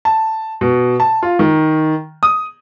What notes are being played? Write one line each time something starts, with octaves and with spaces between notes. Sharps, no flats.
A5
B2
A5
F4
D#3
D#6